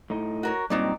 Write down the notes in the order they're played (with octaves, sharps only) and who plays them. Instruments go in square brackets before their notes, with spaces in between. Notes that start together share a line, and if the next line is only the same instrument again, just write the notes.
[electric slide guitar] A2 D#4
[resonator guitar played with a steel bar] F#4 A#4 C#5
[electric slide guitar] G2 A#2 C4 [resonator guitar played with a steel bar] F#3 D#4 D5